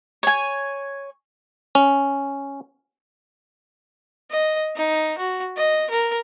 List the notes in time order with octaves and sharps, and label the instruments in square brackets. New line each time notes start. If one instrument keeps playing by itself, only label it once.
[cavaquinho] C#5 G#5
[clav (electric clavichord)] C#4
[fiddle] D#5
D#4
F#4
D#5
A#4